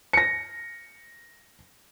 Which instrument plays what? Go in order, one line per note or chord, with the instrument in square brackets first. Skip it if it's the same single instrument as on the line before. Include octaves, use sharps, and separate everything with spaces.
[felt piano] A#6 C#7